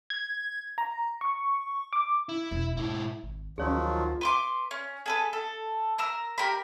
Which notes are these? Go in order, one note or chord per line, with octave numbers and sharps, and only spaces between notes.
G#6
A#5
C#6
D6
E4
E1
G#2 B2 E4
G#1
D2 D#3 F3 F#3 C#4 G#4 C#5
F4
B4 C6 D6
C#4
G#4 A4 B4
A4
A#4 A#5 E6
G4 A#4 A#5 B5